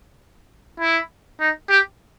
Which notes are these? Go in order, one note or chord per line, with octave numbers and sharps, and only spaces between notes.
E4
D#4
G4